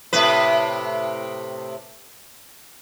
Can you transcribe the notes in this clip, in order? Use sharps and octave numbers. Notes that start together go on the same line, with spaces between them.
A2 C3 B4